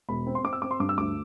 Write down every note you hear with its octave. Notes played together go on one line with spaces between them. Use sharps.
E1 B5
C4
C6
C4 D6
E6
C4 D6
C6
G2 D6
E6
D2 D6